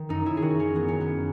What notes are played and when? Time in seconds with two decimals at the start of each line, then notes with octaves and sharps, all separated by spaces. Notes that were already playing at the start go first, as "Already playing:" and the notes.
Already playing: D#3
0.09 F#2 D#4
0.26 D#3 E4
0.37 G#4
0.42 D#3 F#4
0.59 D#3 C#4
0.75 F#2 B3
0.88 D#3 C#4
1.01 B3